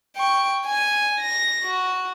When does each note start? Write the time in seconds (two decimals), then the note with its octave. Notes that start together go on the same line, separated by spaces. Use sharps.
0.16 G5 C#6
0.66 G#5
1.21 A#6
1.64 F#4